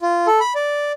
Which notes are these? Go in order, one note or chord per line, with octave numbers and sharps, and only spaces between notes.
F4
A4
B5
D5